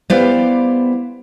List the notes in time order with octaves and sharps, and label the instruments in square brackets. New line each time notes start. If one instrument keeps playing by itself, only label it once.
[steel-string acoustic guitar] G3 B3 E4 C5 D5 F5